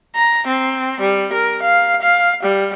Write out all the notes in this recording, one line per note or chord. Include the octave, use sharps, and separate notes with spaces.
A#5
C4
G3
A#4
F5
F5
G3